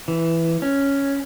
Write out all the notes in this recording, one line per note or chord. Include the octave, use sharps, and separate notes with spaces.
E3
C#4